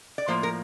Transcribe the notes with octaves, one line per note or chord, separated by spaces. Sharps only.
D5
A2 F3 A#3 C5
A#4